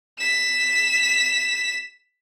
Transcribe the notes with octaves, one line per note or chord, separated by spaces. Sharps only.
B6 E7